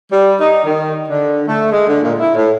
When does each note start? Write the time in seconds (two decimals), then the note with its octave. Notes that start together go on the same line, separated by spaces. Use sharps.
0.11 G3
0.41 D#4
0.65 D#3
1.09 D3
1.47 A3
1.72 G#3
1.87 D3
2.02 A#2
2.19 E4
2.35 A2